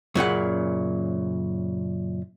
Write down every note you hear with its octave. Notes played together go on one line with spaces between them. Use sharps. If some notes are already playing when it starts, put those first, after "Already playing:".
F#2 A#2 C#3 F#5